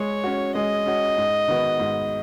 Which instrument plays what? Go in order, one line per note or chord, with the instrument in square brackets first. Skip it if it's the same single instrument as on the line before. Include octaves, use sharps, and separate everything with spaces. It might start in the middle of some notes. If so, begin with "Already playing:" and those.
Already playing: [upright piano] G#3 [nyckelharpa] C#5
[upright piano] C#4 F#4
[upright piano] G#3 [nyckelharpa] D#5
[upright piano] C#4 F#4
G#2
D#3 B3 F#4 B4
G#2